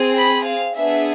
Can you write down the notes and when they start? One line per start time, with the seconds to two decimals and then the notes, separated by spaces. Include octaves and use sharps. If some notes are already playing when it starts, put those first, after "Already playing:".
Already playing: C4 G#4
0.17 B5
0.46 F5
0.76 B3 D4 G#4 E5